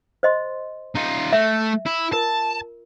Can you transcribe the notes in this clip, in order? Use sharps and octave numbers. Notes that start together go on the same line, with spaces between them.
C5 D#5 C6
D#4 F4
A3 E5
E4
F4 A#4 A5